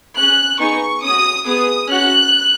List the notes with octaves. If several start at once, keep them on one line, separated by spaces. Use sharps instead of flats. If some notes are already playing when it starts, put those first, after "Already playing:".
C#4 G#4 F#6
B3 D#4 G#4 C#6
C#4 F#4 D#6
B3 G#4 D#6
C#4 F#4 F#6